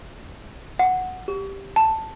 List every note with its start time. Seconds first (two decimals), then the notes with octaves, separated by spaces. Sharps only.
0.79 F#5
1.28 G4
1.76 A5